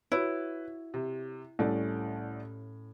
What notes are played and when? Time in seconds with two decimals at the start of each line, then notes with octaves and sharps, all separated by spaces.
0.12 E4 F#4 B4 C#5
0.94 C3
1.59 C2 A2 A3 C#4 D5